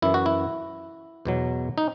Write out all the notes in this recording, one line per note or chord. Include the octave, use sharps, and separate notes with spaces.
F#2 E3 E4
F#4
E4
E2 B2 F#3
D#4